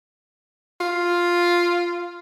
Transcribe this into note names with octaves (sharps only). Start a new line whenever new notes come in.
F4